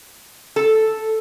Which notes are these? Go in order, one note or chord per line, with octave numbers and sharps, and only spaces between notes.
A4